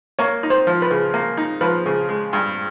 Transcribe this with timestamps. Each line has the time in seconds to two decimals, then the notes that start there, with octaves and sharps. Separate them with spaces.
0.19 A#3 C#5
0.43 D#4
0.50 C5
0.67 F3
0.82 B4
0.91 C#3
1.14 A#3
1.37 D#4
1.61 F3 B4
1.86 C#3
2.09 G#3
2.33 G2